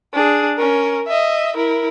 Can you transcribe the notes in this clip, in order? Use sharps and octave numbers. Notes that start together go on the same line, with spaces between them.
D4 G#4
C#4 A#4
D#5 E5
E4 A#4